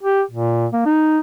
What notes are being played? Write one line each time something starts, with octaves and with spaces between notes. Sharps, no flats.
G4
A#2
A#3
D#4